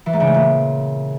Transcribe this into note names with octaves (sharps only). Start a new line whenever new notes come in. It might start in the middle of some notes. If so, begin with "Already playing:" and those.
E3
G#2
C#3
A2
A#2